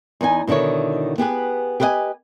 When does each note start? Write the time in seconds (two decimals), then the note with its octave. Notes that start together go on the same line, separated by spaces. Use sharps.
0.21 E2 B3 D#4 G#5
0.47 B2 D3 D#3 E4 C#5
1.18 B3 G4 G#4 B4
1.80 G4 G#4 B4 C#5 D#5 G#5